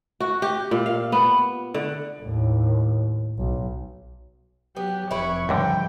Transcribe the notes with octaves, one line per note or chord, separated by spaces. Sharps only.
F#4
G4
A#2
F5
B3
D3
D#2 A2
B1
F#3 B3 G4
F1 E4 B4 C#5
C#2 G#2 D3 F3 G3 G5